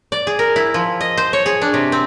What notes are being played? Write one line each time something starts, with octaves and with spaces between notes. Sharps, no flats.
D5
G#4
A#4
E4
F3
D#5
C5
C#5
G#4
D4
C3
C4